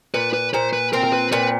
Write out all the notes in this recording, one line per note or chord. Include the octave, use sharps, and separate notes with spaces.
A#2 B4
B4
A#2 C5
B4
C4 A#4
A#4
B4
A#2 B4